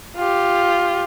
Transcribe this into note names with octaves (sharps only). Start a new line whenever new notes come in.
F4 G4